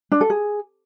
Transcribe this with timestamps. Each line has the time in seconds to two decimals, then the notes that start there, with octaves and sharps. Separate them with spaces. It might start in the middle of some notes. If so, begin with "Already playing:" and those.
0.12 D4
0.21 A4
0.30 G#4